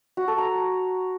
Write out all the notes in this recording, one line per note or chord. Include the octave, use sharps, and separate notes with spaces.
F#4
A4
A#5